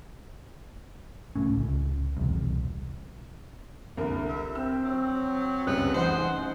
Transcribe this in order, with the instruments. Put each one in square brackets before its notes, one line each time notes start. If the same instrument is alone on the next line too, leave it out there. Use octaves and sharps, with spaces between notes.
[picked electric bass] C2 A2 C#4
C#2
E1 C2
[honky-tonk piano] C2 D3 A#4
[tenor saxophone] E5
[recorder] C4 [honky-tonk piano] E6
[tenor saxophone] F#3
[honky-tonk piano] C#2 G3 F#6 [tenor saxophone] B3
[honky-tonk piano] A1 D#4 F#5 [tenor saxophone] C5